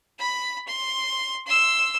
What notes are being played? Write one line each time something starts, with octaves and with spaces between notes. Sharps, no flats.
B5
C6
C6 E6